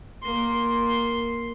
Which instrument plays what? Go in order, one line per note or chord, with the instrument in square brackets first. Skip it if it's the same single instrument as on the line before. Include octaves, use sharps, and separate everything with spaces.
[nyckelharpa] A#3 C6